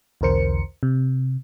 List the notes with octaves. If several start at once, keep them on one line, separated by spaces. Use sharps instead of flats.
B1 E2 D3 A#4 C5 C#7
C3